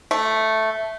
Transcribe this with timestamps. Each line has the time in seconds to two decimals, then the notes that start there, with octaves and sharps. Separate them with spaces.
0.11 A3